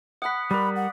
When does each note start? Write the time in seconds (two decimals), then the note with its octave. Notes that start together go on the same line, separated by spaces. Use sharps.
0.22 F#5 B5 D#6 F#6 B6
0.51 G3 A#4 D5 B5
0.76 F#5